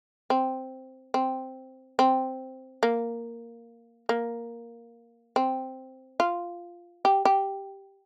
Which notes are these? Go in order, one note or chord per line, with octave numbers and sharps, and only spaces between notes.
C4
C4
C4
A#3
A#3
C4
F4
G4
G4